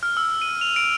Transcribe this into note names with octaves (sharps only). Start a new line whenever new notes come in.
F6
E6
D#7
F7
D7